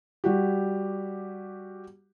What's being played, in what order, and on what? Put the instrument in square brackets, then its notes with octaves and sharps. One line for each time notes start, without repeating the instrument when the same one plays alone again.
[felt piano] G3 F#4 G4